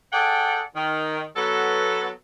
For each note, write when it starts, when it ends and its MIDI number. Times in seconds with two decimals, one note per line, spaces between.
0.12 0.60 68
0.12 0.60 69
0.12 0.60 74
0.12 0.60 78
0.12 0.60 79
0.76 1.22 51
1.36 2.10 54
1.36 2.10 59
1.36 2.10 69